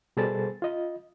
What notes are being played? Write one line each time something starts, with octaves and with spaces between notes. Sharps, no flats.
B2 G3 G#4 A4 C5 A6
F4 D#5